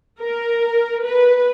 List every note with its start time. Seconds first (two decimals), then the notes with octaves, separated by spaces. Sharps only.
0.19 A#4
1.03 B4